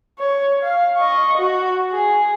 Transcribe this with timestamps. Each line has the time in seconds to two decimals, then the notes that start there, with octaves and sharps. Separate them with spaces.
0.19 C#5
0.63 F5
0.97 D#5 C#6
1.38 F#4
1.93 G#4